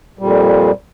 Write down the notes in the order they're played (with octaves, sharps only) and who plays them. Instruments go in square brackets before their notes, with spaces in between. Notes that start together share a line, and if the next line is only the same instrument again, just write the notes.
[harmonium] F2 A#2 G3